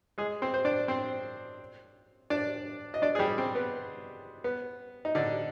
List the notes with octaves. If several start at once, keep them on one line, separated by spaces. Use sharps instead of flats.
G#3 G#4
C4 C5
C5
D4 D5
C4 C5
D4 D5
D#5
D4 D5
G#4
G3 G4
C4
B3
B3
D#4
D3 D4